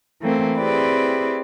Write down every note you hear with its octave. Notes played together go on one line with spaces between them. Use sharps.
E3 A3 A#3 C4
C4 E4 G4 G#4 B4 D5